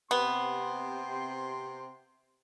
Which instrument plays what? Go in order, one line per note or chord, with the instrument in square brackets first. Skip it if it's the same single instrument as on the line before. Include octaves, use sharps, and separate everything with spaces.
[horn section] C3 G5 C6 [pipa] B3